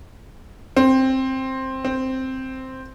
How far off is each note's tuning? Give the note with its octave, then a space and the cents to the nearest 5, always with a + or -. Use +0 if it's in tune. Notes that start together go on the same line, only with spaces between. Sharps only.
C4 +10
C4 +0